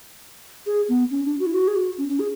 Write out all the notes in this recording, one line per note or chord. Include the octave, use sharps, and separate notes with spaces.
G#4
B3
C#4
D4
F#4
E4
F#4
G#4
F#4
C#4
C#4
G#4